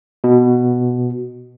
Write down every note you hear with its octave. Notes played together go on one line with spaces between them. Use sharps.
B2